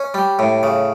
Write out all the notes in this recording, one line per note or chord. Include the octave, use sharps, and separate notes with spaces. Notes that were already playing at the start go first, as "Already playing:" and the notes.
Already playing: C#4
G3
A2
C#3